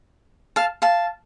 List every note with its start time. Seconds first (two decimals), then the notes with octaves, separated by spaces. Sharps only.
0.56 F5 A5
0.82 F5 A5